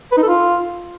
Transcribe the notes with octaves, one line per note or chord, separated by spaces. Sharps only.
B4
D#4
A4
F4